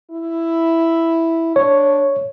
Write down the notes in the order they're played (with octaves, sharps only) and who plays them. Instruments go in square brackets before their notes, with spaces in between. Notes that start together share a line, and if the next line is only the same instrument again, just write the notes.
[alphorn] E4
[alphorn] D4 [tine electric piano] C#5